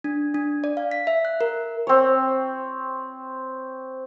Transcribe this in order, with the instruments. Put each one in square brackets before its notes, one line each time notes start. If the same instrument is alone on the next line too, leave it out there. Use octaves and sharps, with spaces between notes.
[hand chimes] D4
D4
D5
F5
B6
E5
F#6
A#4
[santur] C4 C#5